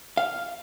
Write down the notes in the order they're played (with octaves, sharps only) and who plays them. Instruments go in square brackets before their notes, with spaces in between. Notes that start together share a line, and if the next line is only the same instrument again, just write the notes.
[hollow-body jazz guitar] F5